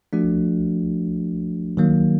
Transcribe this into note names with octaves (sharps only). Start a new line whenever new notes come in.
F3 A3 D4 F#4
D#3 F#3 A#3